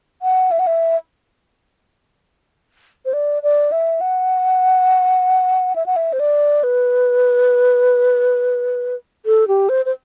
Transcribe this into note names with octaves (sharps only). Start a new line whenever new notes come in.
F#5
E5
F#5
E5
C5
D5
D5
E5
F#5
E5
F#5
E5
C5
D5
B4
A4
G4
C5
C5